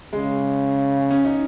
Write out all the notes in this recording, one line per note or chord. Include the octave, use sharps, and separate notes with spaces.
C#3 G#3
C#4
D#4